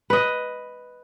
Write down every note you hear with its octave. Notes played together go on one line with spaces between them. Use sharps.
B4 D#5